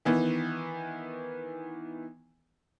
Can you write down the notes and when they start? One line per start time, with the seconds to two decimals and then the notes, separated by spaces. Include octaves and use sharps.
0.05 D#3 E3 B3